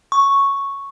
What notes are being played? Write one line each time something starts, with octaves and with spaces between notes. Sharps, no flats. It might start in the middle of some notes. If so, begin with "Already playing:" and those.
C#6